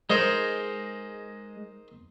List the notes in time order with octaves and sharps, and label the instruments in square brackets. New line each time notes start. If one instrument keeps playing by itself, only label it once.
[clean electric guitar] G#3 [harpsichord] D#4 A#4 C5